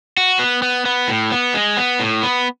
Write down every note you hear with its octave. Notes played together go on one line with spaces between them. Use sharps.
F#4
B3
B3
B3
A2
B3
G#3
B3
A2
B3